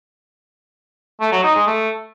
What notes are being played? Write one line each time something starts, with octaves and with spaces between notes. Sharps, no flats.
A3
F#3
D#4
G#3
A3